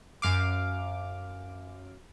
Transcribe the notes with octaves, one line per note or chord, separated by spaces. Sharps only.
F#2 F5 D6